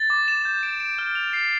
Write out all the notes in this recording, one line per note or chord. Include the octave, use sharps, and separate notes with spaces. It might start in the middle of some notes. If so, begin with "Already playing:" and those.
Already playing: A6
D6
E7
G6
D7
D7
F6
F7
C7